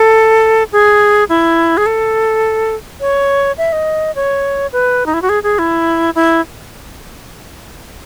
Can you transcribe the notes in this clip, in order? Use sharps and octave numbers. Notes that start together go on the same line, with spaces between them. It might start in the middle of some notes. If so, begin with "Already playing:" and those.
Already playing: A4
G#4
E4
G#4
A4
C#5
E5
D#5
C#5
B4
D#4
E4
F#4
G#4
G#4
E4
E4